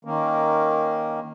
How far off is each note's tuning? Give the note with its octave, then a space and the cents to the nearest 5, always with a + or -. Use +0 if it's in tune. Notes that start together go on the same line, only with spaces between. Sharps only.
D#3 +5 A#3 +0 C#4 -5